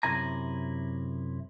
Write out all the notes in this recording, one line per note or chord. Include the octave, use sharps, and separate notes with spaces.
F#2 C3 E4 G#5 A#5